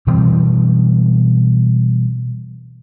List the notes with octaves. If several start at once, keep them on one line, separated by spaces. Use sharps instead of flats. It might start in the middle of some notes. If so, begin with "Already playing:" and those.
B2 E3 G3 C4